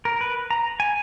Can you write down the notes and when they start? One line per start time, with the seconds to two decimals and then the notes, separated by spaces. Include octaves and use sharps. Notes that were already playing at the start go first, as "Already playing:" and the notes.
0.05 A#4
0.21 B4
0.50 A#5
0.80 G#5